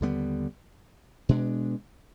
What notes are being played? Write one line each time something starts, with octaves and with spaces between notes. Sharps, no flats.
D#2 D3 G3 B3
B2 G#3 D4